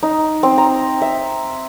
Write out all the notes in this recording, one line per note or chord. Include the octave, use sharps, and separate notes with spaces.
D#4
C4
A#5
E5